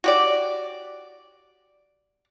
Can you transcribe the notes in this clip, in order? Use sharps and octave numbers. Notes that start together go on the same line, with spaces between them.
F#4 G4 D5